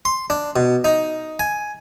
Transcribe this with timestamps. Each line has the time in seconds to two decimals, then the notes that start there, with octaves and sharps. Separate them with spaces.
0.05 C6
0.30 D4
0.56 B2
0.84 D#4
1.39 G#5